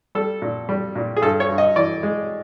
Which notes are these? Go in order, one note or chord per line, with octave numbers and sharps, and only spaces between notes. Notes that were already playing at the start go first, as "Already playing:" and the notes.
G3 A4
A#2
G3
A#2
G#4
G2 A4
C#5
G2
D#5
E3 D5
G#3